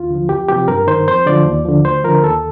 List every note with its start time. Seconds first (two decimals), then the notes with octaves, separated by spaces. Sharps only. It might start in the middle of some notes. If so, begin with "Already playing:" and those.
Already playing: D#2 F4
0.10 D3 F3
0.29 F2 G4
0.49 C3 F3 G4
0.68 G2 A#4
0.87 D#3 C5
1.07 F2 C5
1.26 D3 F3 D5
1.45 D#2
1.65 D3 F3
1.85 D2 C5
2.04 D3 F3 A#4
2.23 D#2 A4